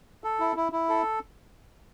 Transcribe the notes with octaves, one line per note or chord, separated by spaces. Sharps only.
A4
E4
E4
E4
A4